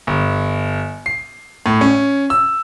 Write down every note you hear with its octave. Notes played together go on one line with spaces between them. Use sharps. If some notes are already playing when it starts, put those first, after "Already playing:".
G1
C7
A2
C#4
E6